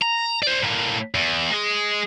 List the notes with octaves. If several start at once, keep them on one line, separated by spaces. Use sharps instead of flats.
A#5
C5 D5
A2 A#3
E2
G#3 G#4